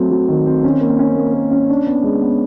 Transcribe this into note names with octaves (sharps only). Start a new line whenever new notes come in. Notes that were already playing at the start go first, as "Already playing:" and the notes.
Already playing: F#3 A3 C4
F#3
D#3
C4
C#4
A#3
C#4
A#3
A#3
C#4
D4
B3
G#3
B3